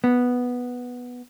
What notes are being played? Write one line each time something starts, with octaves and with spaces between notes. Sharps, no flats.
B3